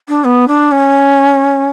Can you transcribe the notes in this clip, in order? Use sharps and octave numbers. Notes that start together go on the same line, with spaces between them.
D4
B3
D4
C#4